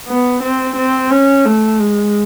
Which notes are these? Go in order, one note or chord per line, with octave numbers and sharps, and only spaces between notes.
B3
C4
C4
C#4
A3
G#3